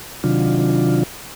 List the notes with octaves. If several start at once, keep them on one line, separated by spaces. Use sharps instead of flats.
C3 D#3 F#3 D4 F4